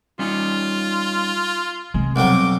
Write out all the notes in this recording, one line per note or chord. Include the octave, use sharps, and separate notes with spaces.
G3 C#4 D#4 F4
C3 G#3
B1 F2 F#3 G3 D6